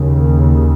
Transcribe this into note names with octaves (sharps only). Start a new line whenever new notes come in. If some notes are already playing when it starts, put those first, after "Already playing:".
Already playing: D#2 C#3